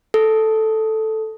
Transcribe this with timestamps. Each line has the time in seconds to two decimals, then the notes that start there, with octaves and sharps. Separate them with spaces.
0.14 A4